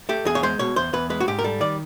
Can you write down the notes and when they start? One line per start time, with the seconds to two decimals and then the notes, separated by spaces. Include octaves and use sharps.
0.09 A3 G4
0.25 E2 G#4
0.35 C#5
0.43 G#3 C5
0.59 B2 C#5
0.76 E2 C5
0.93 E2 B4
1.10 G#3 B4
1.20 F#4
1.28 G#2 G4
1.39 A#4
1.44 G3 A4
1.60 D#3 D5